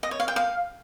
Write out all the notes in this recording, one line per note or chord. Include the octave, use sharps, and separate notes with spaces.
D#5
C#5
F5
G5
F5